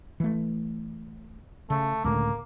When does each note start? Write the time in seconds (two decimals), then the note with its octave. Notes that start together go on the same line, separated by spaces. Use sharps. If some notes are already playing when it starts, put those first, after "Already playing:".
0.20 E3 A3
1.70 C#3 A3
2.04 C#2 A2 D3 A#3